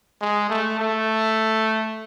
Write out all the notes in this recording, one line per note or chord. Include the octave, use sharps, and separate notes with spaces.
G#3
A3
A3